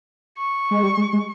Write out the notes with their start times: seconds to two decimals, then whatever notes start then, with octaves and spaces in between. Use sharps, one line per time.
0.38 C#6
0.71 G#3
0.83 G3
0.97 G#3
1.13 G#3